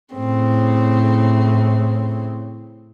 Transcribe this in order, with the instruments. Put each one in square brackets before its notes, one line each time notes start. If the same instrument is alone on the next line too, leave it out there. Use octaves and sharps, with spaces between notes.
[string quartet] A2 C#3 C4